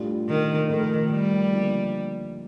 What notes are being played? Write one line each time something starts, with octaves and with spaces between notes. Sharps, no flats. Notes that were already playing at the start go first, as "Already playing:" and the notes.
Already playing: A2 G3 D4 F4
D#3
A2 D#3 F3 A3
G3
D3 F3 A#3 D#4